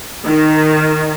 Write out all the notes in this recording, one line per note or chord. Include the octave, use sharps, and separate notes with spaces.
D#3